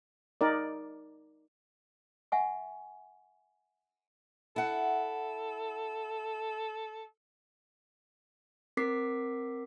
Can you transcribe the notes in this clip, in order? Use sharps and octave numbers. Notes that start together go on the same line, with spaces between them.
D#4 A#4 D5
E5 F#5 G#5 C#6
E4 A4 F#5
C4 A#4 D6 B6 C7